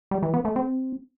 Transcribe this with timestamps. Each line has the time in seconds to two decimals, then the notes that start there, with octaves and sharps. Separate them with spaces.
0.11 G3
0.22 E3
0.34 B3
0.45 A3
0.56 C4